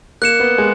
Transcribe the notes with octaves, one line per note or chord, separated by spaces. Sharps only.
A#3 F#6 C#7 E7
B3
G#3